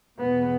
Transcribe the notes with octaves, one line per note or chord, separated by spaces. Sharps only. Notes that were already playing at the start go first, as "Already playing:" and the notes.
E2 B2 B3